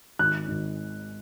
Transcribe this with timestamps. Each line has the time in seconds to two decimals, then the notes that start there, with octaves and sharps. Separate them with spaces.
0.19 G#1 F#6
0.48 G#1